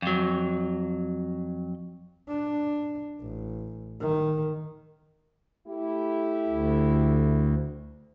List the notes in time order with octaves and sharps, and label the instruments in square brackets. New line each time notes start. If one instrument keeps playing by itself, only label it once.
[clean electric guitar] F2 F#3
[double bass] D4
A1
D#3
[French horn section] A3 E4 G4
[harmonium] D2